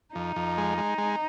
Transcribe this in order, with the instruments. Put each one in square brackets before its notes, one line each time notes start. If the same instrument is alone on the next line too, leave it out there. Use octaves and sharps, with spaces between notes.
[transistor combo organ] F2 [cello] D#4
[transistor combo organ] F2
G#3
G#3
G#3